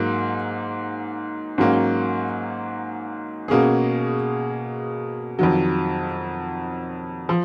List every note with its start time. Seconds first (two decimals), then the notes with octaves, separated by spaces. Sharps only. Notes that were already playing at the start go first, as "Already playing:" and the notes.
Already playing: G#2 F#3 A#3
1.58 G#2 F#3 A#3 C#4
3.48 B2 A#3 C#4 G#4
5.39 F2 D#3 F#3
7.29 F3